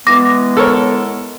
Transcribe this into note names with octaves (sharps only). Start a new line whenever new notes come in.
E3 G#3 B3 D6 A#6
A4 A#4 C#5